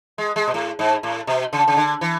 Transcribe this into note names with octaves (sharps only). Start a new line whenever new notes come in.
G#3
G#3
B2
A2
G#2
A2
B2
C#3
C#3
D3
E3